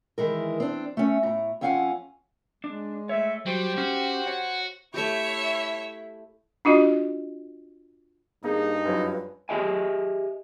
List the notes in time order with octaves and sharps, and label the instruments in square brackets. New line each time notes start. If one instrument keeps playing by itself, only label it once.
[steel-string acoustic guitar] D#3 E3 G#3 A#4
C4 D4
A3 C#4
A2 A#5
F2 C4 C#4 F5 F#5 G#5
[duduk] G#3 [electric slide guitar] D4
[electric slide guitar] A3 C#5 [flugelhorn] E5
[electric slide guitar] F#3 [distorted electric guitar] G3 [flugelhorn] G4 [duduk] C5
[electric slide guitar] C#4 [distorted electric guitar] F#4
[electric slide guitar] C#5 F#5
[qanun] A3 G4 [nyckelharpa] E4 [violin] C#5 E5
[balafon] D4 F4 F#4 D#5
[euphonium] G2 [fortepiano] A#3 [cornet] D#4 [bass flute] G#4
[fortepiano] F#2 F3 F#3 [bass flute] B4
[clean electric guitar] G4 G#4 D#5 E5 G#5